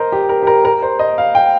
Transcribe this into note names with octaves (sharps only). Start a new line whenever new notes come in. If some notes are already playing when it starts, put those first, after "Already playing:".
Already playing: A#4 C5 D#5
G4
A#4
G4
A#4
A#4
C5
D#5
F5
G5